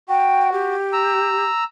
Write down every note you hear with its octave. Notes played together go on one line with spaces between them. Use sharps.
F#4 G5
G4
A#5 E6